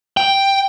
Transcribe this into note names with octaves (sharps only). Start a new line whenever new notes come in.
G5